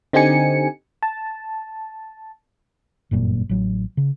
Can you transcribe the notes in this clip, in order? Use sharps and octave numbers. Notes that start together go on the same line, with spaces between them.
D3 C4 D#4 G4 G#5 C#7
A5
G1 F#2 A#2
A1 F#3
C#3